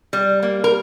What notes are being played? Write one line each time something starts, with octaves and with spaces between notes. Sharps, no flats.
G3
A#3
A#4